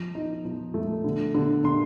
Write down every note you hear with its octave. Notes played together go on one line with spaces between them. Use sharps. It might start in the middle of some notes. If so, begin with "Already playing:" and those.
Already playing: F3
D#4
F3
A3
D3
D3
D3 C6